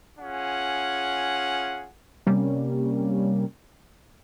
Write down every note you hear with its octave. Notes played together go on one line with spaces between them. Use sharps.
C#4 F4 G#4 F#5
C3 G3 A#3 C#4